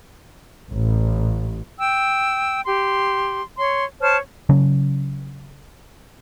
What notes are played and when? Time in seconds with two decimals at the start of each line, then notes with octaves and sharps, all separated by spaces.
0.71 A1
1.79 G5 E6
2.65 G4 C6
3.57 C#5 C6
4.01 C5 C#5 A5 F6
4.49 C#3 F#3 C#4